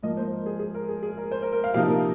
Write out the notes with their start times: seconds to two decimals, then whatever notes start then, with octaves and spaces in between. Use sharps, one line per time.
0.03 G#2 F3 A#3 D#5
0.17 C5
0.32 A#4
0.46 G#4
0.59 G#4
0.74 A#4
0.89 G#4
1.03 G#4
1.17 A#4
1.31 C5
1.42 A#4
1.53 A#4
1.64 F5
1.74 C3 F3 A#3 D#4 F5
1.88 A#4